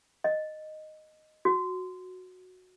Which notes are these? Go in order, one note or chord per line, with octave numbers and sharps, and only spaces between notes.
D#5
F#4